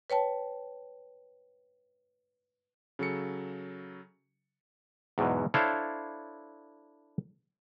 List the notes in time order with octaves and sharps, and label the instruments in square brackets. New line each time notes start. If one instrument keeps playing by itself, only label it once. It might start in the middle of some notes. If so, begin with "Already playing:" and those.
[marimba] B4 C#5 G5 A5
[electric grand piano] C#3 F#3 A4 C#7
[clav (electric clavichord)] E2 G#2 B2 F#3
D4 E4 A4 C5 C#5 F5